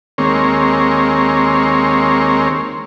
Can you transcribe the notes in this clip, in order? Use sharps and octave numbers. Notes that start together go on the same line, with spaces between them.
D#2 G#3 A#3 C4 C#5